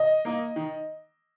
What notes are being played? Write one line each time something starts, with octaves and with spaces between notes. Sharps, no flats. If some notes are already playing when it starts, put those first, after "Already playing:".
Already playing: D#5
A#3 D#4
D#3